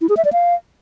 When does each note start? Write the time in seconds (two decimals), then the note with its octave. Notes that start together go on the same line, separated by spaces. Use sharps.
0.01 E4
0.09 G#4
0.17 E5
0.25 D5
0.33 F5